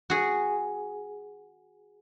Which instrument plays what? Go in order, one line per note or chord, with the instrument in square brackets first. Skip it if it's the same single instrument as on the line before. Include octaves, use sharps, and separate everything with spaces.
[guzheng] F#4 G#4